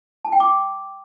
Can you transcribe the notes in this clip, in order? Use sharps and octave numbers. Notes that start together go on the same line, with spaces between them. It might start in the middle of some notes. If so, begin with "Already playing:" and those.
A5
G5
D6